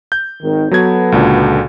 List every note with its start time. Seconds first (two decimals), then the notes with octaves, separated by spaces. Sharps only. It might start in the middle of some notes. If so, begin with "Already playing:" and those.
0.12 G6
0.42 G#1 D#3
0.71 F#3 B3 F#4 A4 B4 G#6
1.12 C#2 A#2 D3